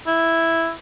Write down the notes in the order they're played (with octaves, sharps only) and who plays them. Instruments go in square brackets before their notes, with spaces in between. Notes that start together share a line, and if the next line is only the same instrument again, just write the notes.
[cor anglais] E4